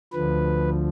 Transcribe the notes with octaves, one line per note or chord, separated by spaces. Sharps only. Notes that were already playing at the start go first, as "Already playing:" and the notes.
D2 D3 F3 B4